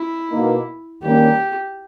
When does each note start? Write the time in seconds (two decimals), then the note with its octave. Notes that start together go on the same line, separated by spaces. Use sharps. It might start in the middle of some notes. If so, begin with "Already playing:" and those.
Already playing: E4
0.28 B2 A#3 D#4
1.02 D#2 D#3 G3 A#3 C#4 G4